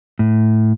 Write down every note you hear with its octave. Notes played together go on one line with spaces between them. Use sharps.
A2